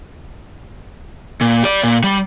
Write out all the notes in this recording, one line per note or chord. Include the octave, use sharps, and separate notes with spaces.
A#2
G4 D5
A#2
G3